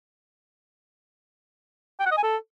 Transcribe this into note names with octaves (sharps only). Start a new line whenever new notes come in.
G5
F#5
D#5
G#5
A4